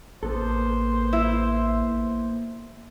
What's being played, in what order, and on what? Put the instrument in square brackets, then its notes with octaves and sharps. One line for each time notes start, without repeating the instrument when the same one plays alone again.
[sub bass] A1 [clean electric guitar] A#3 B3 A4 [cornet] C5
[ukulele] E4